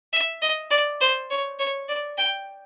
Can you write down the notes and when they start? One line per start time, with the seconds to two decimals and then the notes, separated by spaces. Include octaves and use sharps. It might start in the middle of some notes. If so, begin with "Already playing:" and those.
0.13 E5
0.42 D#5
0.71 D5
1.01 C5
1.31 C#5
1.59 C#5
1.88 D5
2.18 G5